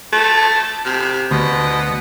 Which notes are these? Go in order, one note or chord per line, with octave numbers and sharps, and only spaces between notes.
A3
C3
D2 B2